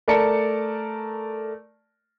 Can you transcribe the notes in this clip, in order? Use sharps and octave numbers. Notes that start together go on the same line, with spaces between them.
A3 A#4 D5 A5 C#7